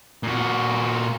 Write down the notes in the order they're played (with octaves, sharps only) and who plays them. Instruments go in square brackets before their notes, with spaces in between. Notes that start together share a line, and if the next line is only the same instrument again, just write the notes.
[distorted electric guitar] A#2 F#4